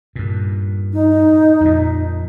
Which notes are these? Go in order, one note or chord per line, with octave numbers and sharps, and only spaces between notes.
G2 A#2
D#4
F2 A#2